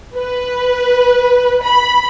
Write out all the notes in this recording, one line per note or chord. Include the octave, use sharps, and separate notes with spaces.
B4
B5